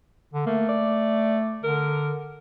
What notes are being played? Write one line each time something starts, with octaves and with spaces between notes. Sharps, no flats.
D3
A3 A#3
D5
D3 A#4